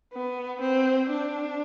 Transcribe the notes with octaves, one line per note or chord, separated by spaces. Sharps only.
B3
C4
D4